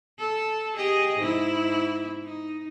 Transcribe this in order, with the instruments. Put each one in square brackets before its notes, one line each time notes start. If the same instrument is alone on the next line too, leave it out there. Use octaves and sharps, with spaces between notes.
[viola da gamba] A4
G4 G#4 D#5
G#2 E4
D#4